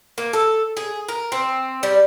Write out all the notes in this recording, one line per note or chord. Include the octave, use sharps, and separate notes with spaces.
A#3
A4
G#4
A#4
C4
G3